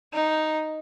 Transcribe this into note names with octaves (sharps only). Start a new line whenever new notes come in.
D#4